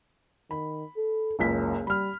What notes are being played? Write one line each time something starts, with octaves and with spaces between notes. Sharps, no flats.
D#3 B5
A4
F#1 C#2 C#3 B6
G3 B5 F6